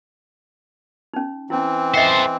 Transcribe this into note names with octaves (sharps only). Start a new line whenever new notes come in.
C#4 D#4
E3 C4 C#4 E4
A4 C5 D#5 E5 G5